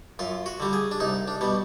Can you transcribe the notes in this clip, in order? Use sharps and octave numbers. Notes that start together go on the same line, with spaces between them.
F#2 F4
F#4
D3 G3
G#4
D4
C2 D#4
D4
B2 G3